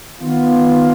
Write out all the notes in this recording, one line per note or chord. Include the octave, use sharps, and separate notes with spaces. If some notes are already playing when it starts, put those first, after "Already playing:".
D#3 B3 F4